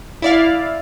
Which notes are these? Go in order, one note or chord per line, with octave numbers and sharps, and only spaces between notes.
E4 D5 F5